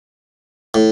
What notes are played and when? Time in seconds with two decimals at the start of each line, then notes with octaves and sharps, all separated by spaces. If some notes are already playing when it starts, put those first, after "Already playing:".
0.74 A2